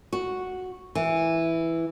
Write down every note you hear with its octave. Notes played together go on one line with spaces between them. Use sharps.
F#4
E3